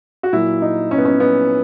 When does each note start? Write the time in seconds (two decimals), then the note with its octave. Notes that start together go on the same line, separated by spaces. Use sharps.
0.23 F#4
0.33 A#2 F#3 E4
0.62 D#4
0.91 C#4
0.98 B3
1.05 C#4
1.20 B3